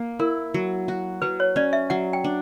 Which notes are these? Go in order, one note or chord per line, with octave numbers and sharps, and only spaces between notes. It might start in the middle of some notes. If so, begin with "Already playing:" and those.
Already playing: A#3
E4 A#4
F#3
F#4
F#3 B4
C#5
C#4 D5
E5
F#3 F#5
G5
D4